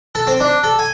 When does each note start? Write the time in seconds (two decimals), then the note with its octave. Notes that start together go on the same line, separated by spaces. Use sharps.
0.15 A4
0.27 C4
0.40 D4
0.63 A4
0.79 G#5